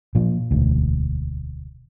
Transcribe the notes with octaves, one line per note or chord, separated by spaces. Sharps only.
A#2 F3
E1 D2